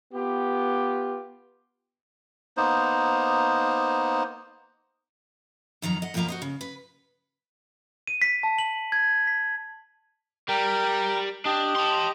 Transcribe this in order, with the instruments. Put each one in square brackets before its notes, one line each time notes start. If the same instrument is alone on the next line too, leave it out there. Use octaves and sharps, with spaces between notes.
[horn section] B3 F4 G4
[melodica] A#3 B3 D#4 C5
[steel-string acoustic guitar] F2 D#3 F#3 A#5
D#5 F#5
F2 B2 F3 A#3 F5 A#5
F#4 C5 D#5
C#3
B4
[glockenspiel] D#7
B6
A5
F#7
G#6
B6
[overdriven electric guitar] G3 [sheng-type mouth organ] A#4 G5
[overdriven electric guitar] D4 [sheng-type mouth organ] G4 D#5
[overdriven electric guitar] A5 C6